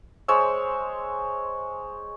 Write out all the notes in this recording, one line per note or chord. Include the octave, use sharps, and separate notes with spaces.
G#3 C5 C#5 E6